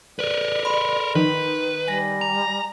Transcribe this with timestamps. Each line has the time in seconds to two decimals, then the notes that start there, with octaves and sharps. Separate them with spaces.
0.19 A#4 B4 D5
0.65 B5 C6
1.15 D#3 B4
1.88 G3 G#5 A#6
2.21 A#5